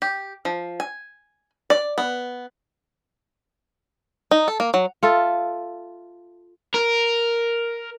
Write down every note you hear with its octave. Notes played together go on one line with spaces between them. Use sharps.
G4
F3
G#5
D5
B3
D#4
A4
A#3
F#3
F4 A4 E5
A#4